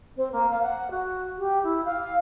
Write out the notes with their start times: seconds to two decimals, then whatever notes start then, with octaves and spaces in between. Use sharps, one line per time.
0.17 C4
0.32 A#3
0.50 F5
0.62 F#5
0.91 F#4
1.39 G4
1.64 E4
1.85 F5